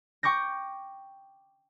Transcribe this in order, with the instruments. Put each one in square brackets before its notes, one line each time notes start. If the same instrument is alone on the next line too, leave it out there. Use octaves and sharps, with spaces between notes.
[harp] G5 C#6 D6 G6 A#6